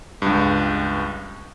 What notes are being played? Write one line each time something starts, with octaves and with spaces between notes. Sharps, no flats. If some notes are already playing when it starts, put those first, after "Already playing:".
C#2 G2